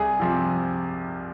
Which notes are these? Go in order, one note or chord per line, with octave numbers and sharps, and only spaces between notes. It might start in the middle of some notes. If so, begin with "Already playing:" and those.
Already playing: C2 G#4
C3 F3